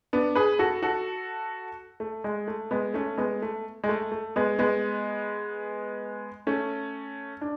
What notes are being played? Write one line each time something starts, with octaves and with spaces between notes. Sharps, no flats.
B3 D4
G#4 B4
F#4 A4
F#4 A4
A3
G#3
A3
G#3 B3
A3 C#4
G#3 B3
A3
G#3
A3
A3
G#3 B3
G#3 B3
A3 C#4
D4